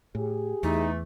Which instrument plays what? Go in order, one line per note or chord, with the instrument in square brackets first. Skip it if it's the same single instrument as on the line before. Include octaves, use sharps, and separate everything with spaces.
[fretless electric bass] A2 [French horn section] G4 G#4
[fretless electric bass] E2 [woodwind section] E3 A3 [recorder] D#4